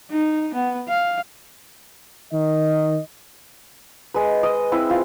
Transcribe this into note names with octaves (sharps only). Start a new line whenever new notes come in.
D#4
B3
F5
D#3 D#5
G#3 B4
D#5 D#6
C4 E4 B4
F4